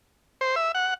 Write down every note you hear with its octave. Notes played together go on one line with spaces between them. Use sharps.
C5
E5
F#5